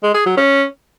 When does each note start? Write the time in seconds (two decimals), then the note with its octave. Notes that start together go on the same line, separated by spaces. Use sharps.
0.03 G#3
0.15 G#4
0.26 F#3
0.37 C#4